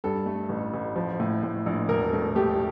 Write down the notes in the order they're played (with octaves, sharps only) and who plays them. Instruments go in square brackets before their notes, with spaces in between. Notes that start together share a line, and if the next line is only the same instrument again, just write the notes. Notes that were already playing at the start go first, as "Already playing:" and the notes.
[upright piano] G2 A4
A3
A1
A1
F3
A2
A2
A#1
E1 A#4
A3
A3 G4